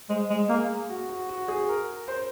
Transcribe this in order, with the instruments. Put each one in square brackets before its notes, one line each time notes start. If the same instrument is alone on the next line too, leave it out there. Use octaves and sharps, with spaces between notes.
[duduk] G#3 [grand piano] C5
[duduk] G#3
[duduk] A#3 [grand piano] G#4
[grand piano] F#4
F#4
F#4
G#4
A#4
C5